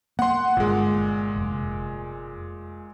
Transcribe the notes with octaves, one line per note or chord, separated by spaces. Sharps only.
A#3 F#5 C6
G1 A#2 G#3
F1